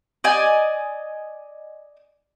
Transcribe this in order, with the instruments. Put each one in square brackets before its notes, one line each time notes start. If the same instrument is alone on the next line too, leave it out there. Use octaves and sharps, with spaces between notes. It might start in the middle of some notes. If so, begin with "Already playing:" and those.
[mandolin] D5 D#5 G#5